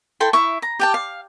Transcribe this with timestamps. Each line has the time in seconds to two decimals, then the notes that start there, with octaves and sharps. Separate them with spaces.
0.20 E4 A4 G5 C6
0.33 E4 E5 C#6
0.62 A#5
0.79 G4 G5 A5
0.94 F5